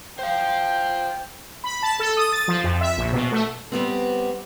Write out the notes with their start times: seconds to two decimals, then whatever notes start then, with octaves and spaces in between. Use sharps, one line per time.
0.19 C5 F5 G5
1.64 B5
1.82 A5
1.99 A4
2.17 D#6
2.32 A6
2.48 F3
2.64 F2
2.81 E5
2.97 A#1
3.13 B2
3.32 A3
3.72 G3 B3 C4